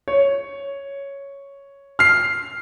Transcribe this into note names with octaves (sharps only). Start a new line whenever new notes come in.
C#5
F6 C7